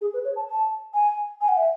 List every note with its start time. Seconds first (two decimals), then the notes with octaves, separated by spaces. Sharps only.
0.01 G#4
0.13 B4
0.24 C#5
0.36 A5
0.48 A5
0.94 G#5
1.41 G#5
1.48 F#5
1.57 E5